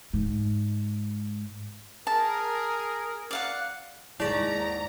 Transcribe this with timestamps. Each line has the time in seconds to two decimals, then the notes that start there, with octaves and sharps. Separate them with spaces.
0.13 G#2
2.07 G#4 A#4 A5
3.31 D5 F5 F#5
4.20 D#2 G#2 E4 G#4 D5 A#5